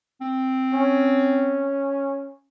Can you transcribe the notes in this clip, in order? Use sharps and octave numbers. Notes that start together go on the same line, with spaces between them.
C4
C#4